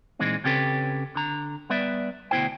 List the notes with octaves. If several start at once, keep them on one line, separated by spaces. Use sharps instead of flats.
A#2 E3 G#3 C4 D#4
C#3 C4 C#4 G4 A4 B4
D3 A#5
G3 B3 B4 D5 E5
D2 B2 A3 E4 C5 G5